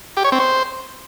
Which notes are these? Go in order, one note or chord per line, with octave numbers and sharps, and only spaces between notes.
G4
C#5
C4
C5